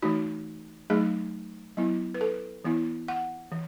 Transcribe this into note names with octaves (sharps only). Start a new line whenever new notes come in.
E3 A3 D#4 F#4
F#3 A3 D#4 G#4
F#3 B3 E4
B4
A4
E3 B3 E4
F#5
E3